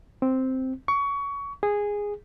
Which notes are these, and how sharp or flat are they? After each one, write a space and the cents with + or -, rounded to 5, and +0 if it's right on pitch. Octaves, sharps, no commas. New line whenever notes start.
C4 -5
C#6 +25
G#4 -10